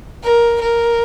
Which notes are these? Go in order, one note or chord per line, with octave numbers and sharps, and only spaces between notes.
A#4
A#4